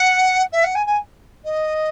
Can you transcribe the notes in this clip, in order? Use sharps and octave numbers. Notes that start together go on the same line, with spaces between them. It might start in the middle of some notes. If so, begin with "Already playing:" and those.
Already playing: F#5
E5
F#5
G#5
G#5
D#5